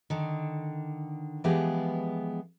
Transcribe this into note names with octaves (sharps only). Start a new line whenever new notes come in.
D3 D#3
E3 F3 G#3 B3 G4 G#4